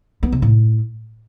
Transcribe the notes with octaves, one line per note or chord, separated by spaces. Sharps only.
B3
C3
A2